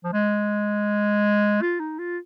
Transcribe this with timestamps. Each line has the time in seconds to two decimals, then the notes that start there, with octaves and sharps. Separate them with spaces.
0.04 F3
0.13 G#3
1.61 F4
1.80 D#4
1.99 F4